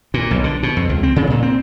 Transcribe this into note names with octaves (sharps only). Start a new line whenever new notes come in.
A#2
B1
D3
B2
F2
C#2
C4
C#3
A#2
C4